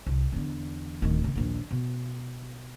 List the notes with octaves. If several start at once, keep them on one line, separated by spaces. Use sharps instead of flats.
C2
E2 D3
D1 D#3
D#2 C#3
A#1 D#2
B2